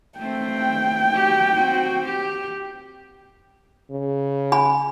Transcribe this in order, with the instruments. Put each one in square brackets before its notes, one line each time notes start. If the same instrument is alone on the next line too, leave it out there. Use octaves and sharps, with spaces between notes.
[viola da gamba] A3 C4 [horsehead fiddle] G5
[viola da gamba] F#4 G4
C4 F#4
G4
[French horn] C#3
[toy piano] G#5 B5